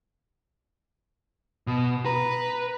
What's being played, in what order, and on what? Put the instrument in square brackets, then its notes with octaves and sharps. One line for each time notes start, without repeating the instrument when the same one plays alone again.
[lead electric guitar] B2
[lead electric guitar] B4 [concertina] A#5